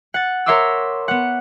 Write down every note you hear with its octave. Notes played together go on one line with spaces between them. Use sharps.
F#5 A6
A#4 C#5 E5 C6 D6 E6
B3 F#5